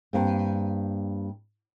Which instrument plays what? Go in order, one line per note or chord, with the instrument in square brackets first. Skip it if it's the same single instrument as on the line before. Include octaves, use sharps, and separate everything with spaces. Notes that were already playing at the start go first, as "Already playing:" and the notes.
[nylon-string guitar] G2 A#3 C4